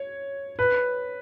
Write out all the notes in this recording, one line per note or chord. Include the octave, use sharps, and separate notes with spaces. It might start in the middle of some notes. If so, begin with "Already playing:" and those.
Already playing: C#5
B4